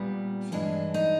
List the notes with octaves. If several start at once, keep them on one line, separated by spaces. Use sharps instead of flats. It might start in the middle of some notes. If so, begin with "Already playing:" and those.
Already playing: A#2 G3 B3
G2 E3 G#3 D4
D#4